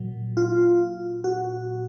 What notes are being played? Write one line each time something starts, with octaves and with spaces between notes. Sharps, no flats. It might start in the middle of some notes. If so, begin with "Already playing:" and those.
Already playing: A#2 F#3
F4
F#4